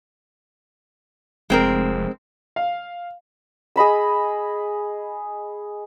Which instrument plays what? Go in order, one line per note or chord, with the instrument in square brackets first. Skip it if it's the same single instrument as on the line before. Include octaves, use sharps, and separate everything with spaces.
[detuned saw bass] F1 [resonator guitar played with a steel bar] G#3 C4 A#4
[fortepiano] F5
[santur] G#4 D#5 B5 E6